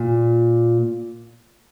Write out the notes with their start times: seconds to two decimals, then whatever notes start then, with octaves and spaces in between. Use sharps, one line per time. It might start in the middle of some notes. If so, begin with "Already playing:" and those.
Already playing: A#2